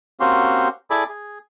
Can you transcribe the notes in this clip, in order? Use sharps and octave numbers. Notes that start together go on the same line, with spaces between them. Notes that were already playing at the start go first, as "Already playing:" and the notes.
A#3 C4 C#4 F#4 G4 C6
E4 G#4 A4 D5 G#5 B5
G#4